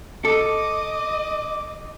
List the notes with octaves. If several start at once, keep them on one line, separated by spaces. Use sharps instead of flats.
A4 D#5 D6